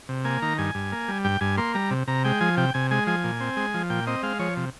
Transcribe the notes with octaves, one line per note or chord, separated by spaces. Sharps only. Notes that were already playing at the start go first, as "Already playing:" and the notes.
C3
A#3 G#5
D#3 A#5
G2 G#5
G2
A#3
G3
G2 G5
G2 G#5
A#3 C6
G3 A#5
C3
C3 A#5
G#3 G5
F3 G#5
C3 G5
C3 G#5
G#3 G#5
F3 G#5
A#2
C4
G#3
F3
A#2 G5
C4 D#5
G#3 F5
F3 C#5
C3